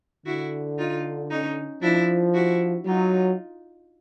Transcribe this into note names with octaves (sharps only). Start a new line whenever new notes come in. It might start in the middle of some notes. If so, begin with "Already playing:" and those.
D3 E4 F#4
D#4 F4
C#4 D#4
F3 D4 E4
E4 F#4
F#3 D#4 F4